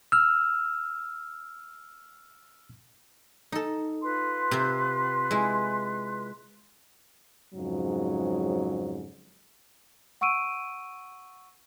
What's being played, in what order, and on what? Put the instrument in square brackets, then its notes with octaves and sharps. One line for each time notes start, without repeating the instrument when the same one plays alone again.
[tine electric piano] E6 F6
[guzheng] D#4 A4
[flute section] F4 B4 C6
[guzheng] C3 C4
G#3 E4
[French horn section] F2 G#2 C#3 F#3
[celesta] F#5 C#6 E6 D7 D#7